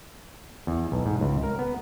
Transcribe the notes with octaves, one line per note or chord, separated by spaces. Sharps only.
E2
B1
G#2
C#2
A#4
B3